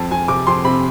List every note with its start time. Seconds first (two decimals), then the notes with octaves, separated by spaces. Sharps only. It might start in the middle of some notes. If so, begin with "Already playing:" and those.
Already playing: F2 A5
0.11 F2 G#5
0.28 C3 D6
0.47 F2 C6
0.65 C3 B5